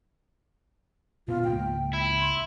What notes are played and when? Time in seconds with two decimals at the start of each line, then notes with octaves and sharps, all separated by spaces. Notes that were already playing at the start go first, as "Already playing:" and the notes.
1.28 A#2 B3 C#4 F4
1.44 C#2 G#2 A#3 G5
1.94 E4
2.21 C6